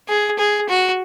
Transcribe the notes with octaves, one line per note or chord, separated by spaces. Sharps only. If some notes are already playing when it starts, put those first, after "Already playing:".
G#4
G#4
F#4